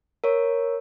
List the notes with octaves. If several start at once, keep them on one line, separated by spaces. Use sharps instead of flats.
A#4 C#5